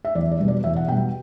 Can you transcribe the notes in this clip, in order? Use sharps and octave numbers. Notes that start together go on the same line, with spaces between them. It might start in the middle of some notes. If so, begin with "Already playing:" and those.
E5
E2 D5
D5
B2 G3
D5
E2 E5
F#5
B2 G3 G5